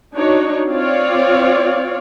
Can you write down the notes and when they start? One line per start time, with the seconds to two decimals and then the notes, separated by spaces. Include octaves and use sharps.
0.14 D4 D#4 F#4 C#5
0.69 C4 F4 C#5 D5 F5